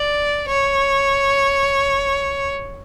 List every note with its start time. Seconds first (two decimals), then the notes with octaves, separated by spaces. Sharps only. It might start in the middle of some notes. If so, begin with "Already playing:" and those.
Already playing: D5
0.49 C#5